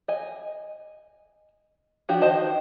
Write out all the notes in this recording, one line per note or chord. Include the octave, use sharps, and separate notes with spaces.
D#5 G#5
F3 D4 F#4 G4
D#3 C5 D#5 A5